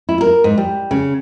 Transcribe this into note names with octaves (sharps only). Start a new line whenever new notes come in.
E4
A#4
G#2
G3
C#3